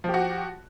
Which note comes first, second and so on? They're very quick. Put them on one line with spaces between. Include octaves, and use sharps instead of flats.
F3 G4 F#4